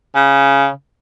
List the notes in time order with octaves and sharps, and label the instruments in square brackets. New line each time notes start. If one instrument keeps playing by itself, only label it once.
[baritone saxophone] C#3